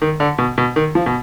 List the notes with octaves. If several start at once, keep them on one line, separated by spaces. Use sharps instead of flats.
D#3
D3
B2
B2
D#3
F3
B2